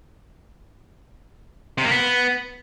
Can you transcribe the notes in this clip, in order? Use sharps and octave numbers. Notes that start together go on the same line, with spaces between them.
C3
A#3
B3